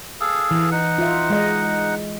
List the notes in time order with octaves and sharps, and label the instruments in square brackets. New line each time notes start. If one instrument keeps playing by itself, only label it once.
[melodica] G#4 A4 F5
[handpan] E3
[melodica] D#4 F#5
[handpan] F4 E5
G#3 D#5